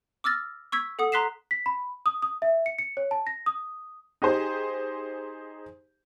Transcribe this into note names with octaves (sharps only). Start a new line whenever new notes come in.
D6 E6 F6 A6 A#6
C#6 E6 G#6 B6
A4 F#5 D#6
A#5 C6 F#6 B6 C7 E7
B6
B5
D#6
D#6
E5
C#7
C#7
C#5
A5
A#6
D#6
D#4 G4 G#4 C5